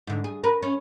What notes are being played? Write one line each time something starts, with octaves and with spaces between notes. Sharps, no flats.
G#2 D3
G#4
A#4 B4
C#4